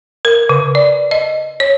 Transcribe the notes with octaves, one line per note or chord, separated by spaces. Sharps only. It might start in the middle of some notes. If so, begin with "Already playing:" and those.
A#4
C#3
D5
D#5
C#5